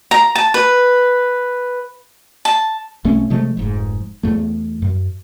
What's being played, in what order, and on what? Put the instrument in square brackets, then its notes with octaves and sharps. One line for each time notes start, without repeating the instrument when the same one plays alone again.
[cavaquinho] A#5
A5
B4
A5
[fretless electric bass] B1 A3 C4 C#4
C3 F3 G#3 A3
F1 G#2
E2 A3
F#2